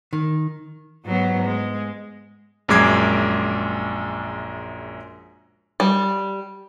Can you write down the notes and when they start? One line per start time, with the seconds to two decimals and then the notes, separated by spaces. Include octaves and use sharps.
0.13 D#3
1.04 G#2 F#3 B3
1.46 G#3
2.68 A#1 F#2 G#3 D6 G#6 C7
5.80 G3